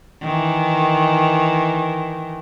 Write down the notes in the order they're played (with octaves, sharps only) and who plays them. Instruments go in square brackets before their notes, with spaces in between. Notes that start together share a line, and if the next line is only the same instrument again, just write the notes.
[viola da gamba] D#3 E3